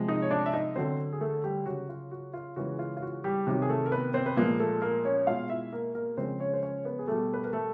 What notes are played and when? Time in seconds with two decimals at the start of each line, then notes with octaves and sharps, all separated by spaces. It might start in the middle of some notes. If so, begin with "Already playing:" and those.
Already playing: C3 F3 G#3
0.08 D#4 D#5
0.22 C#5
0.31 D4 D5
0.46 E5
0.53 D#4 D#5
0.76 D3 F#3 C4 C5
1.13 G#4
1.21 A3 A4
1.44 G3 G4
1.66 C#3 F#3 F#4
1.89 F4
2.11 F#4
2.33 F4
2.56 C#3 E3 G#3 F#4
2.79 F4
2.97 F4
3.02 F#4
3.24 G3 G4
3.47 C3 D#3 F#3
3.62 G#4
3.69 A3 A4
3.86 A#4
3.92 B3 B4
4.14 C4 C5
4.26 B4
4.37 A#2 F3 G#3 A#3 A#4
4.60 A3 A4
4.81 A#3 A#4
5.05 C#4 C#5
5.27 B2 G#3 F4 F5
5.50 E4 E5
5.72 A#3 A#4
5.95 A#3 A#4
6.17 C#3 F3 G#3 C4 C5
6.40 C#4 C#5
6.54 C5
6.63 C#4 C#5
6.85 B3 B4
6.99 G#4
7.07 B2 G3 A3 A4
7.34 B4
7.43 A#4
7.53 A3 A4